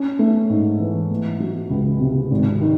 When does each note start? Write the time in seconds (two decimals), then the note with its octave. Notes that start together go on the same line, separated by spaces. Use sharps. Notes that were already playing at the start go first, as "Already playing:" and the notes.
Already playing: C#4
0.19 A3
0.50 G#2
0.80 E3
1.10 A3
1.40 F#3
1.70 C#2
2.00 C3
2.31 G#1
2.61 D#3